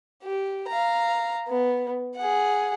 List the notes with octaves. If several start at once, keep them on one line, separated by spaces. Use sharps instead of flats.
G4
F5 A#5
B3
G#4 F#5